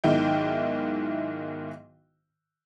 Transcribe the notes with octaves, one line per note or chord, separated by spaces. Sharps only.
B1 G#2 D#3 E4 G5